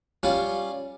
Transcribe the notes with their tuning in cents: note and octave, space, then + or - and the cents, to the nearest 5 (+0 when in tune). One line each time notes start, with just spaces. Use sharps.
G3 +0 C#4 +0 F4 +0